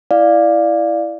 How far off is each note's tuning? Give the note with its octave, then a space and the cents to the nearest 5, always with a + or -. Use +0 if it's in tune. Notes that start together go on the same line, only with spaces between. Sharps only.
E4 +0 D5 +10 F5 +0